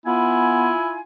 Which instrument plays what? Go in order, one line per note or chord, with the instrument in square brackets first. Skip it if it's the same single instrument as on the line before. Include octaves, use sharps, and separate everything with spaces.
[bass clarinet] B3 [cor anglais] E4 [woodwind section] F4 G#5